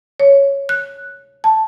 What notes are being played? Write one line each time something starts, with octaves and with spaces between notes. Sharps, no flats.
C#5
F#6
A5